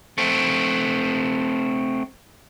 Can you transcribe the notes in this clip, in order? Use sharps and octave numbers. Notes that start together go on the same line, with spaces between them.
A3 C4